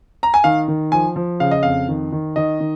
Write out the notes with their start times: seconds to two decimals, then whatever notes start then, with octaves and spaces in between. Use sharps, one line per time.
0.23 A#5
0.34 G#5
0.44 D#3 F5
0.68 D#3
0.92 F3 G#5
1.16 F3
1.40 C#3 F5
1.51 D#5
1.63 F2 F5
1.88 D#3
2.12 D#3
2.36 D#3 D#5
2.60 D#3